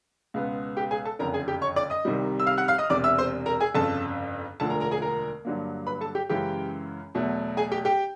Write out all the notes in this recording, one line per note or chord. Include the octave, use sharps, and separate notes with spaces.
C#2 B2 G#3 B3
G4 G5
G#4 G#5
A4 A5
F#1 F2 D3 A#4 A#5
G#4 G#5
G4 G5
C#5 C#6
D5 D6
D#5 D#6
C2 C3 D#3 G3
E6
F5 F6
F#5 F#6
F5 F6
D#5 D#6
E1 E2 C3 D5 D6
E5 E6
C5 C6
A#4 A#5
G#4 G#5
G1 F2 C#3 A4 A5
E1 D2 D3 F3 A4 A5
A#4 A#5
A#4 A#5
G#4 G#5
A#4 A#5
G2 D3 F#3 A#3
B4 B5
A4 A5
G4 G5
F#2 C#3 E3 G#3 G4 G5
E2 B2 F#3 A3
G#4 G#5
G4 G5
G4 G5